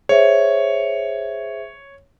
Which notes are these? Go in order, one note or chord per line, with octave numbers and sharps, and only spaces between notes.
G#4 C5 C#5 E5